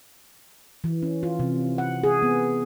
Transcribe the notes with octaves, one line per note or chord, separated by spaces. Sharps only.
E3
C#4
F4
C3
F#5
G#4
B3